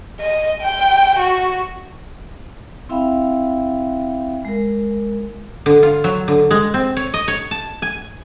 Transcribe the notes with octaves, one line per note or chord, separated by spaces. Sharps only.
D#5
G5
F#4
C4 E4 E5 F5 G5 B5
G#3 A#4
D3
F4
F#3
D3
G#3
C4
C#5
D#5
C#5
A5
G#5